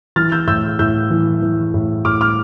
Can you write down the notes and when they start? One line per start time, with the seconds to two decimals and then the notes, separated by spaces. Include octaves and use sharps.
0.16 E3 F6 A6
0.32 E6 G6
0.47 A2 E6 G6
0.79 A2 E6 G6
1.10 E3
1.42 E3
1.74 A2
2.05 A2 D6 F6
2.21 D6 F6